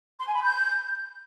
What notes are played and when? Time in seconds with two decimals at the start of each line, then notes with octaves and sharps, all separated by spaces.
0.18 C6
0.26 G#5
0.34 B5
0.42 G6